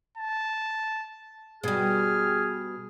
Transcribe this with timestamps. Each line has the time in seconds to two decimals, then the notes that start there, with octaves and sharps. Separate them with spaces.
0.17 A5
1.63 B2 G3 G#4 F6